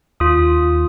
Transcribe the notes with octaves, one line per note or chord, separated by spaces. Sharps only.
D#2 F4 D#6